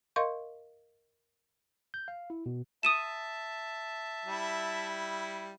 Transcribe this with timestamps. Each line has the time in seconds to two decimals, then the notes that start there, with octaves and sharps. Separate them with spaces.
0.16 A#4 D#5 F5 C6 C#6 G6
1.94 G6
2.08 F5
2.30 E4
2.46 B2
2.83 E5 A5 D#6 D#7 E7
4.25 G3 E4